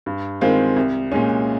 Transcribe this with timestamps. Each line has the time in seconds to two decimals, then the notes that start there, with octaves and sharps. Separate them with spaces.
0.06 G2
0.41 D#3 G#3 C4 F4
0.76 C2
1.12 A#2 G#3 C#4